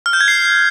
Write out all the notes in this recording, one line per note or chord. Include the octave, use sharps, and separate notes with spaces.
F6
G6
G#6
C7